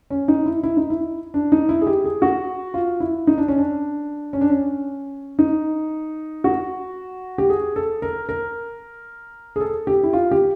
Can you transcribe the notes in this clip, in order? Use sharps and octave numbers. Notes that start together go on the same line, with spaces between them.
C#4
D#4
E4
E4
D#4
E4
D4
D#4
E4
G#4
G4
G#4
F#4
F4
E4
D#4
D4
C#4
D4
C#4
D4
C#4
D#4
F#4
G4
G#4
A4
A#4
A#4
G#4
A4
G4
E4
F4
G4